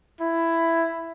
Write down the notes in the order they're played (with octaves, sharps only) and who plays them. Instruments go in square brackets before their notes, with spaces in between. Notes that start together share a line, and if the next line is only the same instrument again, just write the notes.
[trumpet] E4